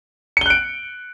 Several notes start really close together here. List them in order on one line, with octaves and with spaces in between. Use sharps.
C#7 G7 F#6 D7